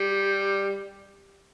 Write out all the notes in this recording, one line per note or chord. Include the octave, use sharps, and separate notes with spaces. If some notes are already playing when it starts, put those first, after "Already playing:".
Already playing: G3